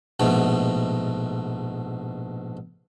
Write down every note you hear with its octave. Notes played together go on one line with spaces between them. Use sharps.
A#1 G#2 B2 A3